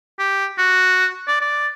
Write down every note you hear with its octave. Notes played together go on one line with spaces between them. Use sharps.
G4
F#4
D5
D5